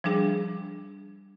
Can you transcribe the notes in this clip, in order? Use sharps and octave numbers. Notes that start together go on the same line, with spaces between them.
F3 G3 D4 G#4